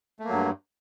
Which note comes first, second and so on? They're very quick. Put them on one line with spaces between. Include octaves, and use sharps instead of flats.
A3 A#3 F#3 G2